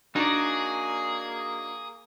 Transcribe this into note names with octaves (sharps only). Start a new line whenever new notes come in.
A#3 D4 D#4 F#4 G#4 D5